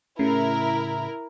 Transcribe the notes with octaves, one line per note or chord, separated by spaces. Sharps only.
A2 C#3 E4 A#4